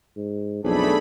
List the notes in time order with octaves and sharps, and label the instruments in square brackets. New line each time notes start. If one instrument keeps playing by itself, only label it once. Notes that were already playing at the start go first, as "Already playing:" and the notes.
[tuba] G#2
[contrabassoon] B1 [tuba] F2 [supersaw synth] A3 B5 [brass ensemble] D4 G#4